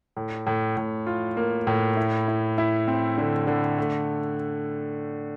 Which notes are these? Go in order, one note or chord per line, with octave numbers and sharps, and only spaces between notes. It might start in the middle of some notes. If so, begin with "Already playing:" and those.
A2
A2
A2
F4
A#3
A2
E4
E4
E4
C4
D3
D3
A3